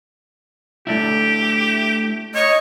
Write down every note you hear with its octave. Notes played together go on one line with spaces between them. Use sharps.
A3 D4 E4 G4
C#5 D#5